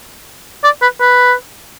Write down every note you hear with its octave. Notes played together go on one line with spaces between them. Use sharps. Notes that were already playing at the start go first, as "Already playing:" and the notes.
D5
B4
B4